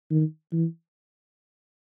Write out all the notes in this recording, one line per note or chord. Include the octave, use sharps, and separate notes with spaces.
D#3
E3